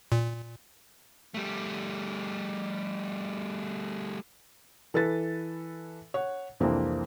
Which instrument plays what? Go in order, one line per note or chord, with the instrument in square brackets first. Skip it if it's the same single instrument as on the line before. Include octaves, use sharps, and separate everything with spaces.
[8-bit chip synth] A#2
[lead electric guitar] G3 A3
[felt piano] E3 A4 B4 A6
C#5 F#5
C2 F2 E3 A#3 C4 D4